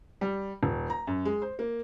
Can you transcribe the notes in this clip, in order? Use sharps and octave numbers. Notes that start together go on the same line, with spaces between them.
G3
D#1
A#5
F#2
G#3
C5
A#3